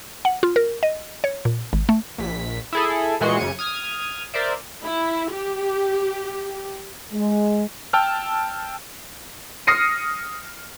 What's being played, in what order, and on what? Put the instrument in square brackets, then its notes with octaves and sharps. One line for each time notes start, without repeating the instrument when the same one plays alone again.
[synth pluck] F#5
F4
A#4
D#5
C#5
A#2
G#1
A3
[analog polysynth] A#1 B6
E4 G#4 A4
A#2 E3 G#3 F#4 C6 C#7
F#2 C#3 G#6 C#7 D#7
D#6 F6 G#6
A#4 C5 D5 E5
[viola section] E4
G4
[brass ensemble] G#3
[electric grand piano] G5 A5 E6 F6
[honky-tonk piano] D#6 F6 A#6 C7 C#7 D#7